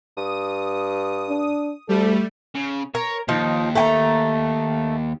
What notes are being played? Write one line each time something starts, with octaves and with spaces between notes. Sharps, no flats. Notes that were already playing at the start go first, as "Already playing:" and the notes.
G2 D#6
D4
D2 G3 A3 A4
C#3
A#4 C#5
D#2 F3 D#4
A3 G5 A#5